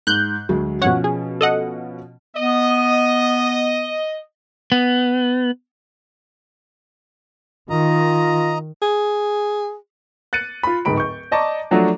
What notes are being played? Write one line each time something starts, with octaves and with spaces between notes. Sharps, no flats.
G#2 F#6 G6
D2 F#3 G#3
B2 F3 C#4 C#5 F#5
G#4
A4 D#5 F#5
B3 D#5
B3
D#3 F4 D#5 A#5
G#4
F#6 A6 C#7 D#7
F4 B5
D1 G#2 B5 D7
C#6 G6
D5 D#5 A5 A#5 C#6 D6
F3 F#3 A3 D4 F#4